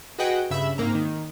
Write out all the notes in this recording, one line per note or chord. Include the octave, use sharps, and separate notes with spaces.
F#4 G#4 B4 D#5 F#5 G5
G2 C#3 E5 B5 E6
G#2 A#3 C4 A#5
D#3